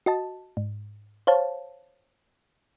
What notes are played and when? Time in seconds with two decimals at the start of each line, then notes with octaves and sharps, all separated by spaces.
0.06 F#4 D#5 A5
0.57 G#2
1.27 C5 C#5 F5 A5